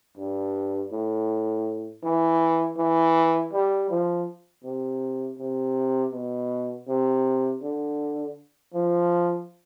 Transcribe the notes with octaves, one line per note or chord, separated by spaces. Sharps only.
G2
A2
E3
E3
G3
F3
C3
C3
B2
C3
D3
F3